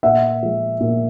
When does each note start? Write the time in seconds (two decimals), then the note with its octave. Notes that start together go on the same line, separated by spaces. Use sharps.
0.03 A#2 E5 F#5
0.43 F3 G#3
0.81 A#2